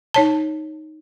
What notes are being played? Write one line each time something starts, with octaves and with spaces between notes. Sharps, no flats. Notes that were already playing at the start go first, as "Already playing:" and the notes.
D#4 C#5 A5